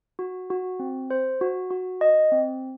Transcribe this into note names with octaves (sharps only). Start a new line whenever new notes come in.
F#4
F#4
C4
C5
F#4
F#4
D#5
C4